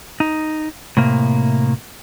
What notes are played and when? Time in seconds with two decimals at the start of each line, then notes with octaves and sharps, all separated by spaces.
0.20 D#4
0.97 A2 C3 A#3